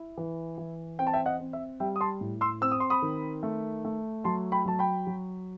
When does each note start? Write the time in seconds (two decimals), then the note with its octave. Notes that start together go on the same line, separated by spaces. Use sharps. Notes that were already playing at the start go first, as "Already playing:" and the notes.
Already playing: E4
0.17 E3
0.58 E3
0.99 C4 G5
1.07 A5
1.13 E5 G5
1.26 D#5 F#5
1.40 C4
1.53 E5
1.80 G3 E5 G5
1.96 D#6
2.01 A5 C6
2.21 A2
2.41 C6 E6
2.61 C4 E6
2.71 D#6
2.80 C6
2.90 B5 D#6
3.02 D#3
3.43 A3
3.85 A3
4.24 F#3 A5 C6
4.52 G5 B5
4.65 F#3 A5
4.79 G5 B5
5.07 F#3